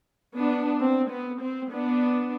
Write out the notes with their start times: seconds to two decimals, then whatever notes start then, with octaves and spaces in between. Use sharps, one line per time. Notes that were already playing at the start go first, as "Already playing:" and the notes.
0.35 B3 D4
0.80 C4
1.10 B3
1.41 C4
1.71 B3 D4